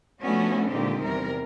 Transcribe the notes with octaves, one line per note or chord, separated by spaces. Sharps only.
F3 A3 B3 C#4 D4 F#4
A#2 D3 D#3 G#3 C4 G4
E2 C3 G3 A#4